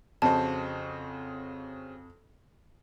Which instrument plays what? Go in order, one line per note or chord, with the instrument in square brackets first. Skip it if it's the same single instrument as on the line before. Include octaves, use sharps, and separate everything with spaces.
[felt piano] F2 [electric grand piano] C#3 F#4 C5 [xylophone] A5